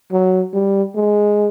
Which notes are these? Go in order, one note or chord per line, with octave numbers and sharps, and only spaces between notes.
F#3
G3
G#3